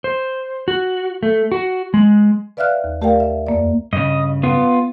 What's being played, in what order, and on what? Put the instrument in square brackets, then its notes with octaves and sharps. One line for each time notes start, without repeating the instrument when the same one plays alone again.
[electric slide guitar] C5
F#4
A3
F#4
G#3
[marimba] B4 D5 E5 F5 F6 F#6
D#2
A3 G4 A#4 D5 F5 G5
E5
F2 A#3 D5
[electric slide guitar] G2 C#3 [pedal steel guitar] D#5
[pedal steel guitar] B3 F4